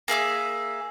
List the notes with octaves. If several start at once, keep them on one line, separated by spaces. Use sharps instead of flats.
A#3 G#4 E5 D6